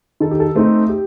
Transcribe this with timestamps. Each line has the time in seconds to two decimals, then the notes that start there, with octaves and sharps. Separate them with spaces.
0.20 D#3 A4
0.31 G4
0.40 A4
0.55 A3 C4 D#4
0.89 G4